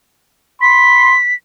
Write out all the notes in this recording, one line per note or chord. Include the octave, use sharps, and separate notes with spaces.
B5 C6 B6